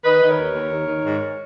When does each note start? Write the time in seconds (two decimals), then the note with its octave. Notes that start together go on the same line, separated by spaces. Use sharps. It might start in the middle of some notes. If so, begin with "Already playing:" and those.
0.04 D#3 B4 D#5
0.21 D#3 D#5
0.29 A#4 C#5
0.38 D#2
0.55 D#2
0.72 D#3
0.87 D#3
1.05 G#2